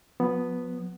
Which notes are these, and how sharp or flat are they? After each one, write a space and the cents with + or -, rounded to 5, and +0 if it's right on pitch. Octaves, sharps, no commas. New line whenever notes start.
F3 +40 B3 +0